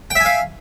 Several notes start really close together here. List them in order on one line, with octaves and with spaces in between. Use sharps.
G5 E5 G#5 F5